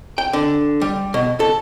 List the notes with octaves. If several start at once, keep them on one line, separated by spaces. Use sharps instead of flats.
G5
D3
G3
B2
A4